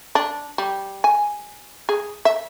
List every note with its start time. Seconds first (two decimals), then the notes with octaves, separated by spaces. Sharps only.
0.15 D4
0.58 G3
1.04 G#5
1.89 G#4
2.25 E5